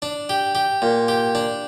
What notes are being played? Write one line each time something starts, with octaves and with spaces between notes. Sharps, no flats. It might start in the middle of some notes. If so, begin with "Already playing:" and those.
D4
G4
G4
A#2
G4
D4